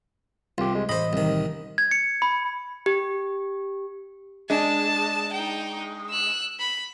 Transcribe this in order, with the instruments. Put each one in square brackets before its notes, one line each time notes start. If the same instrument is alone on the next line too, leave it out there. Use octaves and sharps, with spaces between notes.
[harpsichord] C2 [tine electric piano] F4 G4
[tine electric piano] G#3
[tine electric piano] A1 D#5 [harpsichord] C5 B5
[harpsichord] C2 D#3
[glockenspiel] G#6
C#7
B5
[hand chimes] G4
[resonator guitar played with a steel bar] G#3 D4 [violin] A5
[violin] D#4 G5
E6 F#6
B5